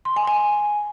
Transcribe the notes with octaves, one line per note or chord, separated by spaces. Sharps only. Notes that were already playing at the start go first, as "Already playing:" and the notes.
C6
G#5
G#5